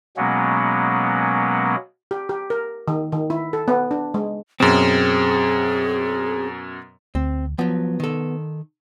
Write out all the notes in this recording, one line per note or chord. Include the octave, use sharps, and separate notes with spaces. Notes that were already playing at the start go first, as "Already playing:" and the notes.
B2 F#3 G#3 A#3 B3 C#4
G4
G4
A#4
D#3
D#3
E4
A4
B3
D4
G#3
F#2 B2 C4 G#4
D2 C4
F3 F#3 B3
D#3 A4